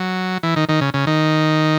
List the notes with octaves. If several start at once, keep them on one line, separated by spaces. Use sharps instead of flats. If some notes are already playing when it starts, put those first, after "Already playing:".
Already playing: F#3
E3
D#3
D#3
C#3
C#3
D#3